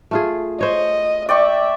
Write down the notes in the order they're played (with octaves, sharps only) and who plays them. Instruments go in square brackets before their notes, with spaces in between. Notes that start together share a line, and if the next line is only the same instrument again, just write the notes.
[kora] A3 F4 G#4
[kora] C5 C#5 [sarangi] D#5
[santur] D5 G5 C#6 [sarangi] E5